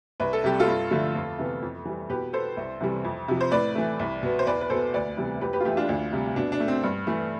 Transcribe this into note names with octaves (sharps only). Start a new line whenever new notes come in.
C2 B4
A4
C3 G3 G4
F4 A4
G2
D3 F3 A3
F2
C3 E3 B3
F2
E3 G3
B2 G4 B4
B3 A4 C5
C2
C3 E3 G3
F2
C3 F3
C5
A2 B4 D5
E3 A3
C2
B2 B3
C5
E2 B4 D5
B4
B2 B3 A4 C5
D2 B4 D5
C3 E3 G3 B3
F2 G4 B4
G4 B4
F4
E3 A3 E4 G4
D4 F4
D2
C3 G3
B2 D4
D4
A3
C4
G2
E3 A3